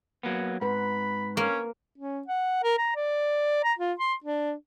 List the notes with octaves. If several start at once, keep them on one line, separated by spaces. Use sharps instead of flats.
F#3 A#3 B3
G#2 C4 B4 F#5 B5
A#3 C#4
C#4
F#5
A#4
A#5
D5
A#5
F4
C6
D4